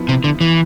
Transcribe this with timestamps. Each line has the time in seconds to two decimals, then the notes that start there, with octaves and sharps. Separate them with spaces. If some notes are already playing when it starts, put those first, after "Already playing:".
Already playing: F3 B3 E4
0.09 C3
0.24 D3
0.41 E3